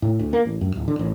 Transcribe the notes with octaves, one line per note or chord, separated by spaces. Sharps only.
A2
D2
A#3
A1
F#2
D1
D3
A1